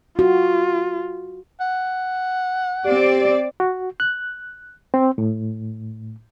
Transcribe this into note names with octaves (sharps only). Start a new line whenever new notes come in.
F4 F#4
F#5
C4 G4 D5
F#4
F#6
C4
A2